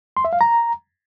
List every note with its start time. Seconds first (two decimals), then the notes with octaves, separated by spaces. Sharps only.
0.17 C6
0.25 E5
0.33 F5
0.41 A#5